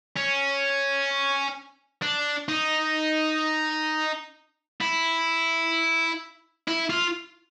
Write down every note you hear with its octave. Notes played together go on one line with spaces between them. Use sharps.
C#4
D4
D#4
E4
E4
F4